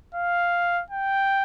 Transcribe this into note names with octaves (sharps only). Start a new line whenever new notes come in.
F5
G5